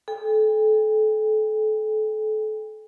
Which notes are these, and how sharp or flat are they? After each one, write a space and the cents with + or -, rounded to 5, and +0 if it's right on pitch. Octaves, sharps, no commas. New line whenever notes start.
A4 -30 G5 +45